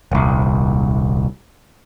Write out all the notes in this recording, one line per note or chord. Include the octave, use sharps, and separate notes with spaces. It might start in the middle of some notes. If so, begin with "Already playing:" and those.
D#1 C2